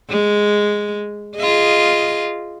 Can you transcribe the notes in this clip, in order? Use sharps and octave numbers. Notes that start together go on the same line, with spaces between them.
G#3
F4 G#4 D#5